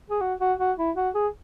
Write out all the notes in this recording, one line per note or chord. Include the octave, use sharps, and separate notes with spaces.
G#4
F#4
F#4
F#4
E4
F#4
G#4